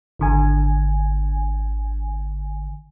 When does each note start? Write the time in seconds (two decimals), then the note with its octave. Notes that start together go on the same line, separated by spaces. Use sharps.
0.19 G#1 D3 G#5